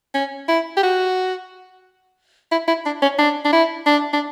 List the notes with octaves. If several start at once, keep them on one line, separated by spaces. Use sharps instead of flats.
C#4
E4
G4
F#4
E4
E4
D4
C#4
D4
D4
E4
D4
D4